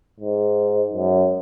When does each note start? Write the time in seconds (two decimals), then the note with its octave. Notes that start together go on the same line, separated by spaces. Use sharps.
0.20 G#2
0.93 F#2